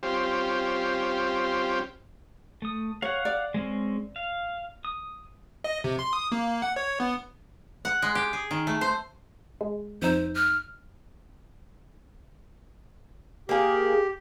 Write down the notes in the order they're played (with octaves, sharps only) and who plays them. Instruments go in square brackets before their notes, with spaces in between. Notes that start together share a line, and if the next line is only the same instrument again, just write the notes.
[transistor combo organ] G3 C4 C#4 F4 G4 C5
[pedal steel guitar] A3 D#6
[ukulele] C#5 [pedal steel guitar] F5 F#5
[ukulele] D5
[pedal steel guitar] G#3 C4 C#4
F5
D#6
[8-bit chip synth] D#5
C3
C6
D#6
A#3
F#5
C#5
B3
[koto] F#5
G#3
G4
G#4
D#3
A3
C5
[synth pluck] G#3
[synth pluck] F2 D#4 E6 [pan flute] C5
[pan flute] F6
[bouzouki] A#3 G#4 [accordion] G4